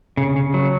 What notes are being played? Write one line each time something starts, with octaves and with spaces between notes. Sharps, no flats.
C#3
C#3
F#3